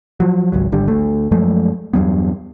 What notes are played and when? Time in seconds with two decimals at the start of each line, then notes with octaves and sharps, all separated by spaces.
0.20 F3 F#3
0.52 G#1 C#2 F#3
0.72 G#1 D3 G3
0.88 D2 A3
1.31 F#2 F3 G#3 A3
1.93 E2 G2 F#3 B3